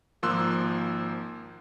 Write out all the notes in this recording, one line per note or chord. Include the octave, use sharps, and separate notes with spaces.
G#1 F3 A#3 C6 E6 F#6